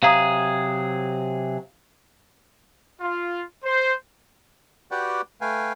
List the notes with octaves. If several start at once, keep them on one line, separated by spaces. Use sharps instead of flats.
C3 F#3 G#4 F5 A#5 D#6
F4
C5
F#4 G4 B4 D5 F#5 G5
A3 B4 F5 G5 G#5